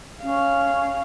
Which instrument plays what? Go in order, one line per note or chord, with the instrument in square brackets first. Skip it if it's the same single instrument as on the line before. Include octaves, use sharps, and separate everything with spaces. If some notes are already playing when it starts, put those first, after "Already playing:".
[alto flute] C#4 [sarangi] F5